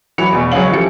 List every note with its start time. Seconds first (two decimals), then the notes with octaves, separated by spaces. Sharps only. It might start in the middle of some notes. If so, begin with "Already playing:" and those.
0.18 E3 F#3 F#4 B5 C#7 F7
0.33 E2 B2
0.52 C#2 F#3 G#3 C#4 F5 F#7
0.71 E3 F3 G3 A4 C#7